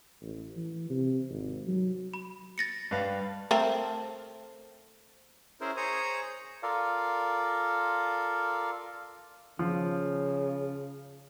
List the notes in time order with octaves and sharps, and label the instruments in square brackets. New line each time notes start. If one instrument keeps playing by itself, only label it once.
[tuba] A1
E3
C3
G#1
F#3
[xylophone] B5
A6 A#6 C#7
[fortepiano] G2 B4 F5
[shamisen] A3 C4 A#4
[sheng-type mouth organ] C#4 E4 G#4 A#4 C5
G#4 C5 C#5 A#5 D#6
[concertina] F4 A4 A#4 D5 F5
[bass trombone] C#3 [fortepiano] F3